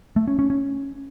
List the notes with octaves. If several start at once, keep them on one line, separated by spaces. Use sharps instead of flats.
A3
C#4
C#4
C#4